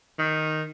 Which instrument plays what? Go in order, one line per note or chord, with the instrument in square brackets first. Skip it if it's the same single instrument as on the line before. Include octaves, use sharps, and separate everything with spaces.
[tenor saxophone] D#3